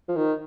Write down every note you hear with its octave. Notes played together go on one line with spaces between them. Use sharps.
F3
D#3